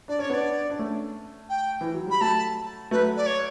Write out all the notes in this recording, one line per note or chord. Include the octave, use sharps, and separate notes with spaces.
D4 D5
C#4 C#5
B3 D4 D5
D4
A3 C#4
G5
E3
F#3
G3 B5
F#3 A3 A5
F#3 A3 B4
D5
C#5